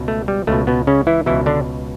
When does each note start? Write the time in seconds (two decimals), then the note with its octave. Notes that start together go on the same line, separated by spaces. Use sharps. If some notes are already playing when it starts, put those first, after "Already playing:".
Already playing: C#2 B2
0.08 A3
0.28 G3
0.47 C#2 B2 A3
0.67 B2 B3
0.87 C#3 C#4
1.07 E3 E4
1.26 C#2 B2 E3 E4
1.46 D3 D4